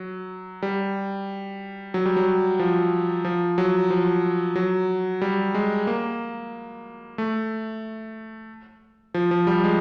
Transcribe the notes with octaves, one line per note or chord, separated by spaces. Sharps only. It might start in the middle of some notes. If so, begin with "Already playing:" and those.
Already playing: F#3
G3
F#3
G3
F#3
F3
F3
F#3
F3
F#3
G3
G#3
A#3
A3
F3
F3
G3
G#3